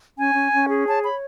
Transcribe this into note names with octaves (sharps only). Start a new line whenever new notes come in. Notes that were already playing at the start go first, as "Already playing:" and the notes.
C#4 G#5
C#4
C#4
G#4
C#5 A5
C#5 B5